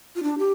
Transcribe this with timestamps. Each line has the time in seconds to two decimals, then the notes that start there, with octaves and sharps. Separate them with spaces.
0.16 F4
0.23 D4
0.38 G4